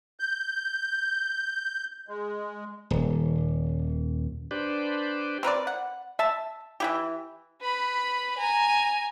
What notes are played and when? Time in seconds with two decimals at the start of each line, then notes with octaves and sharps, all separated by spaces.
0.20 G6
2.09 G#3
2.90 D#1
4.51 D4 G4 B4 C5 D5
5.43 C4 A#4 B4 D5
5.67 F#5
6.19 E5 A5
6.80 E3 E4 G4
7.61 B4 B5
8.38 G#5 A#5